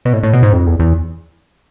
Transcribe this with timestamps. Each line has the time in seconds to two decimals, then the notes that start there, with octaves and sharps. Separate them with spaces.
0.05 B2
0.13 A2
0.23 A2
0.33 B2
0.43 G#2
0.53 F2
0.67 E2
0.80 E2